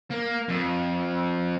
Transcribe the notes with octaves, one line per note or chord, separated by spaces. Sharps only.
A#3
F2